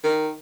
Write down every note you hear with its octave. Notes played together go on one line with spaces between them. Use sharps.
D#3